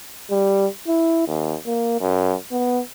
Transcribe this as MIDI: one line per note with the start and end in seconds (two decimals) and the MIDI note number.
0.31 0.67 55
0.88 1.25 64
1.28 1.55 39
1.66 1.97 58
2.01 2.34 42
2.52 2.80 59